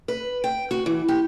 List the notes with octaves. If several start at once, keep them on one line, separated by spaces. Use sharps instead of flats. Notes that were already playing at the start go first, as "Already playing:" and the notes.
B4
G5
F#4
E3
G4